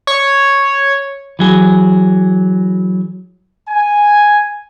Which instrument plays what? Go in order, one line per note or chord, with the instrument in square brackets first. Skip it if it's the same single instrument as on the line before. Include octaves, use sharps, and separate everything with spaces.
[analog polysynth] C#5
[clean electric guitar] E3 F#3 G#4
[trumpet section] G#5